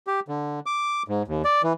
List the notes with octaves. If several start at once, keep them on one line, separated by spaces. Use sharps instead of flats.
G4
D3
D6
G#2
D#2
D5
E3